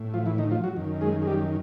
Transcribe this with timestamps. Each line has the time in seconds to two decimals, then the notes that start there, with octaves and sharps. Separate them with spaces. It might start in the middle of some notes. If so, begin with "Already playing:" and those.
Already playing: A2
0.14 F3 F4
0.26 E3 E4
0.38 D#3 D#4
0.51 F3 F4
0.64 F#3 F#4
0.76 F#2 D#3
1.01 G#3 G#4
1.22 G#4
1.27 G3 G4